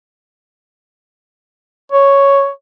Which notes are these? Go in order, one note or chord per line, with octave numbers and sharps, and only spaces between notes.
C#5